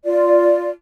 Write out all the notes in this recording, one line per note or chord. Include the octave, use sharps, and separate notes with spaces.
F4 D5